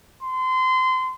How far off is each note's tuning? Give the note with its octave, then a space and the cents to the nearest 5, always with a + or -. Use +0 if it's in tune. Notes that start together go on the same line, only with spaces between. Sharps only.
C6 -25